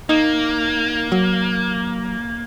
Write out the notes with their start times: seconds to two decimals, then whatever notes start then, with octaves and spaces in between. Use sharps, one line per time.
0.09 A#3 D#4
1.12 F#3